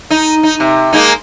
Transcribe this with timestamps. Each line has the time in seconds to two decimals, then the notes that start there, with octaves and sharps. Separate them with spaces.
0.10 D#4
0.43 D#4
0.60 C3
0.93 G#3 A#3 D#4